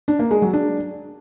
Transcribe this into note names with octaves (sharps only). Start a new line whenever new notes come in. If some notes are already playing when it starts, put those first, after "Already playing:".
D4
A#3
G#3
F#3
D4